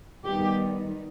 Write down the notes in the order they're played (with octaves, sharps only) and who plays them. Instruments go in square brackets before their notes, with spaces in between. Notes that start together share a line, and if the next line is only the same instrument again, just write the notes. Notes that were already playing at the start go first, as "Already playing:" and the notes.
[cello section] D#3 G3 B3 D#4 G4